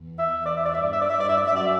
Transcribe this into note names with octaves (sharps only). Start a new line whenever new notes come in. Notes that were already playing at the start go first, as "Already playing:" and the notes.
Already playing: E2
E5
E2
D5
E5
D5
G2 E5
D5
E5
D5
G2 E5
D5
E5
D5
E5
F#2 D5
E5